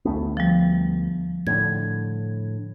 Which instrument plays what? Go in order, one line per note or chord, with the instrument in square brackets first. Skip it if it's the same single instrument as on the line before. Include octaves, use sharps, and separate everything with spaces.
[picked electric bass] D2 A3 B3
[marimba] F3 G3
[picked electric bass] A2 D3 [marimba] G#6